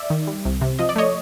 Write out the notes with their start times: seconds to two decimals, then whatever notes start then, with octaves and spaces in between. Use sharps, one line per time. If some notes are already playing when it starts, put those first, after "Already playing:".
Already playing: D5 E5
0.10 D#3
0.27 G3
0.45 C2
0.61 C3
0.79 F3 D#5
0.89 D5
0.96 A3 C#5 D#5